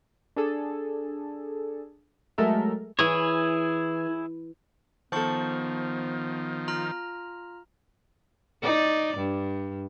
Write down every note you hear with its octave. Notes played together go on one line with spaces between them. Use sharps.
D4 G#4 A4
F#3 G#3 A3 A4 A#4 E5
E3 E4 G#4 C#5
D#3 F3 B3 A4 C5 A5 C#6
F4 A#5 F6
D#4 D5
G2